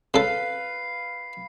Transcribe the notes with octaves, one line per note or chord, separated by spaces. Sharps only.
C#3 A4 B4 F5 C7